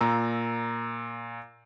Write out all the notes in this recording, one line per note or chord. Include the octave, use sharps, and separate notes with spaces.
A#2 A#5 E6